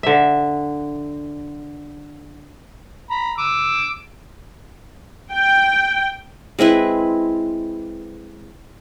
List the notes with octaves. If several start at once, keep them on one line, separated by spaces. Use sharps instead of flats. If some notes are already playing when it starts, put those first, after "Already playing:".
D3 E5
A#5 B5
D6 E6
G5
G#3 C4 E4 B4